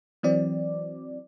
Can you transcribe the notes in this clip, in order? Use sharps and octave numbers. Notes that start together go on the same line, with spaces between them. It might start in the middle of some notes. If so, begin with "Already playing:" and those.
E3 F#3 C4 D5